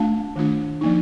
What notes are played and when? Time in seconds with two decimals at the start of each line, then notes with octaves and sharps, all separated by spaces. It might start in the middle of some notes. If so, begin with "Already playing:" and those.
Already playing: A3 D4 F4 F5 A5
0.36 D#3 A3 D4 F4
0.81 F3 A#3 D#4